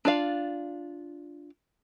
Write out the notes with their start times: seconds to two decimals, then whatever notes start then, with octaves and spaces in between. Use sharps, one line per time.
0.05 D4 F4 D5 F5